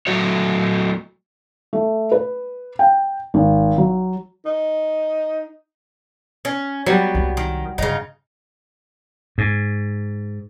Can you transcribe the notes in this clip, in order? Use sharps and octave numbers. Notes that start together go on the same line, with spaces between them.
F#3 A3 F#4 C#5
A3
B4
G5
G#1
F#3
D#4
C#4
F#3 G3 B3
C2 F4
D#3
G2 C#3 D#4
G#2